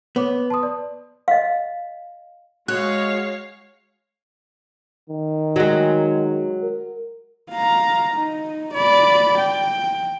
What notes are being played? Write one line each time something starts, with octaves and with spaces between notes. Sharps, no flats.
B3 C#5 D6
A5 C6 D#6
D5
D#5 F5
G#3 F#4 C#5 F5 F#6
D#3
F#3 G#3
A#4
F5 A#5
D#4
D5 B5
G5